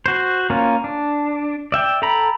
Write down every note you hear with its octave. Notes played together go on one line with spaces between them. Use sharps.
F#4 C5
A#3 C#4 F4
D4
D5 E5 G5
A4 G5 A#5 B5